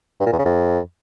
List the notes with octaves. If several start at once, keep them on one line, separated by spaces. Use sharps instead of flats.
G2
A#2
E2
C#3
F2